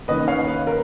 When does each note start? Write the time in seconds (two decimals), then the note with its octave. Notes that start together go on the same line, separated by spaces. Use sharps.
0.08 D#3 A#3 C#4 B4 D#5
0.27 C#5 F5
0.47 B4
0.67 A#4